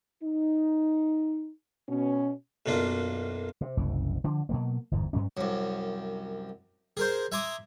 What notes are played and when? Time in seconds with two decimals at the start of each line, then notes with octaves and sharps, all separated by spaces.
0.23 D#4
1.89 B2 C#4
2.66 B1 F#2 A#3 D4 F4
3.61 C3
3.77 F#1 C2 F#2 E3
4.24 D3 F3 D4
4.49 B2 F#3 A#3
4.92 G1 E2 G#2
5.13 G2 F#3 C#4
5.37 C2 F#2
6.97 G#4 A#4 C5
7.32 E5 G#5 A#5 C6 D6 D#6